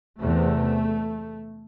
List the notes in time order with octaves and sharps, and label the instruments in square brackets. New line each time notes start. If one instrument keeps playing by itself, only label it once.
[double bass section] E2 C3 A3